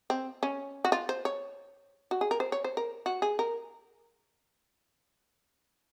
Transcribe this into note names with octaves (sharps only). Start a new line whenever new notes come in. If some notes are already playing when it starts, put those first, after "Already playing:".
C4
C#4
F#4
F4
C5
C#5
F#4
G#4
A#4
C5
C#5
C5
A#4
F#4
G#4
A#4